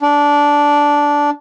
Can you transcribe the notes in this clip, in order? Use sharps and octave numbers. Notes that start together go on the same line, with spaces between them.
D4